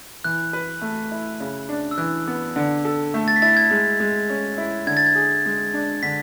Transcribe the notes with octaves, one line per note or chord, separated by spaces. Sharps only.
E3 F#6
B4
A3
E4
C#3
D4
E6
E3 F#6
B3
D3
A4
A3
A6
B6
E4 A6
G#6
G#3
G#3
C#4
E4
D3 G#6
A6
G#6
G#4
G#3
D4
D3 B6